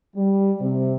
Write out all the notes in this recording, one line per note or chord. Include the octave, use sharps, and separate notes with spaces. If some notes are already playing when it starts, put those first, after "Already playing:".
G3
C3